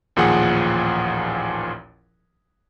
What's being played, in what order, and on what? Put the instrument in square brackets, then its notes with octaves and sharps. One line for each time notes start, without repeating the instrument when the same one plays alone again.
[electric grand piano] A1 D#2 A#2 F3 G#4 F#5